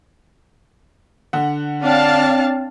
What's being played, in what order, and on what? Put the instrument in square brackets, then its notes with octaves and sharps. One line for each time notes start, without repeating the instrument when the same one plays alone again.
[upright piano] D3 F#5
[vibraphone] C4 C#5 G5 [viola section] D4 F5 A5